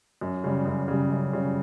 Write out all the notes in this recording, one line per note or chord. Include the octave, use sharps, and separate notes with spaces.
F#2
C#3 G3
F#2
C#3 G3
F#2
C#3 G3